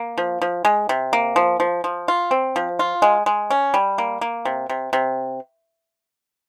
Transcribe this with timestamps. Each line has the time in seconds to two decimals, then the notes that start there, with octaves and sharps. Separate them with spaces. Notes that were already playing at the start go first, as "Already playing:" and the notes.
Already playing: A#3
0.18 F3
0.42 F3
0.65 G#3
0.89 C3
1.13 A#3
1.36 F3
1.60 F3
1.84 F3
2.08 F4
2.31 C4
2.56 F3
2.79 F4
3.02 G#3
3.26 G#3
3.50 C#4
3.74 G3
3.98 A#3
4.21 A#3
4.45 C3
4.69 C3
4.93 C3